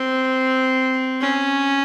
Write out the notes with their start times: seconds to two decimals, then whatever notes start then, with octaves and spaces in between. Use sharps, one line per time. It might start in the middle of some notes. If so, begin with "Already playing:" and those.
Already playing: C4
1.21 C#4